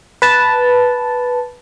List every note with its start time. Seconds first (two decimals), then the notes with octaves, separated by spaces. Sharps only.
0.22 B4 A5